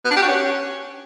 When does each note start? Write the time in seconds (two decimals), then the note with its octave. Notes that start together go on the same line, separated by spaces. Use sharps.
0.05 B3
0.11 D4
0.17 G4
0.22 F#4
0.28 C#4